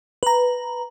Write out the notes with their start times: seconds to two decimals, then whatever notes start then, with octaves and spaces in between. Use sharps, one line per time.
0.23 B4 A#5